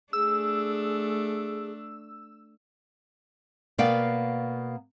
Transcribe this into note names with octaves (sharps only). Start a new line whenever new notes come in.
A3 D4 G#4 E6
B2 A#3 B3 D5 F5 G5